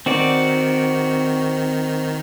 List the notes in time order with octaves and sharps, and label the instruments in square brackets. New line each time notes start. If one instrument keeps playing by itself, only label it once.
[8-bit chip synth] D#3 [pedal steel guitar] C4 F#4 D5